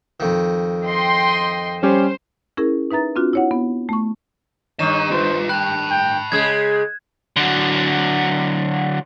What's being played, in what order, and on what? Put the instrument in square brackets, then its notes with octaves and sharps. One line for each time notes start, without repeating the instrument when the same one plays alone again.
[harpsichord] F2 D#3
[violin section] D#5 G5 C6
[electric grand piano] G3 C#4 G4 [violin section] C5
[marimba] C#4 E4 G#4 A#4
D#4 B4 E5 A#5 A6
C4 D4 F4 F#4
E4 C#5 F#5
B3
A3 C#6
[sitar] G2 D#3 [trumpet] C#5 [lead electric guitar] D#5 A#5 [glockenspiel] E7
[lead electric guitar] F4 B4 [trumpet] C5
[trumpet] G5 [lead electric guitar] A5 B5 [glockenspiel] F#6
[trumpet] G5
[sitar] C#3 G#3 G#4 [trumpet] D#5 [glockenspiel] G#6
[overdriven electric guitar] D3 F#3